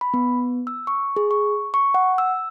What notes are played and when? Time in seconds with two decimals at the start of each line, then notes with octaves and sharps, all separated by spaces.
0.01 B5
0.14 B3
0.67 E6
0.87 C#6
1.16 G#4
1.31 C#6
1.74 C#6
1.94 F#5
2.18 E6